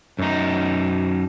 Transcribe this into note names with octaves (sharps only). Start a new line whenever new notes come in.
F#2 D#4